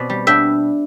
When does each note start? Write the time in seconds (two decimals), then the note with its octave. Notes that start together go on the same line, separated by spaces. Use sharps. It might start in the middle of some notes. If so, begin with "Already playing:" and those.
Already playing: B2 C4 B4 D5
0.10 G3
0.27 D4 E5 G5